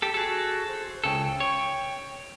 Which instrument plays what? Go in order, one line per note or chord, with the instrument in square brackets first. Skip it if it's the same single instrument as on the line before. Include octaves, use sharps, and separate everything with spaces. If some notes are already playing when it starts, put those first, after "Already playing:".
[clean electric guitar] G4 A4
[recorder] F#4 [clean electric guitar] G#4 A4
[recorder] F#4
C5
[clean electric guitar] C#2 C#3 A4 [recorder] G5
[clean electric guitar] C#5